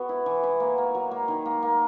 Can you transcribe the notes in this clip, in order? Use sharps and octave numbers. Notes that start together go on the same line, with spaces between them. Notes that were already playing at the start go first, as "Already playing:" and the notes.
Already playing: B3 F#4
E4
E3
E4
A#3
A#3
F#3
A#3
D#3
A#3
A#3